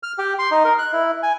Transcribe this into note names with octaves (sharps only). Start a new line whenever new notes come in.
F6
G4
C6
D#4
A#4
F#6
E4
G#5